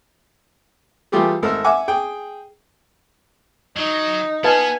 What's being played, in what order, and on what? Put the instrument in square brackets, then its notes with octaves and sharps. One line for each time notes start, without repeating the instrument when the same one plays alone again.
[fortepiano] E3 G3 A3 F4 G4 G#4
G#1 A3 A#4 E6
E5 F#5 G#5 D6
G#4 G5
[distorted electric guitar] F#3 [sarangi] D#4
[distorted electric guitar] B3 [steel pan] B4 F5 A5 [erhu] G#5